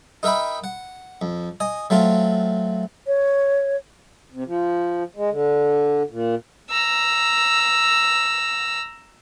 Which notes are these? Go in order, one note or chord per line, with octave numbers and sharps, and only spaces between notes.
D#4 A#4 E5 G5 B5
F#5
F2
D#5 G#5
F#3 A3 C4 F4
C#5
C3
F3
G#3
D3
A#2
A#5 E6